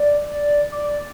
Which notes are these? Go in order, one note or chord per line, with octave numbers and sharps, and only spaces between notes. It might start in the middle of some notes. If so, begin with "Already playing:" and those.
Already playing: D5
D5